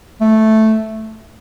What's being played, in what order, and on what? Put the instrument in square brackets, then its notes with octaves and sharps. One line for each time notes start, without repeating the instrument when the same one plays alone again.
[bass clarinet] A3